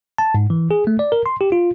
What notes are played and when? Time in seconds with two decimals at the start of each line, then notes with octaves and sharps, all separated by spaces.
0.18 A5
0.34 G#2
0.50 E3
0.71 G#4
0.87 A3
0.99 D5
1.12 A#4
1.26 C6
1.41 G4
1.52 F4